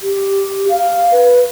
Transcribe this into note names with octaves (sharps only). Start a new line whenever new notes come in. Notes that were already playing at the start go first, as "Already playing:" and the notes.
G4
F5
B4